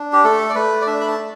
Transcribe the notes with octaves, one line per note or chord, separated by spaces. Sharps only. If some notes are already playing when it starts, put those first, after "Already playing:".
Already playing: D4
G4
A3 A4
D5
A3 B4
D5
D4 E5
B5
A5
D4